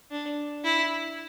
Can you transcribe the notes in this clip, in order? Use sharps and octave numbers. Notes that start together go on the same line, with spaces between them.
D4
E4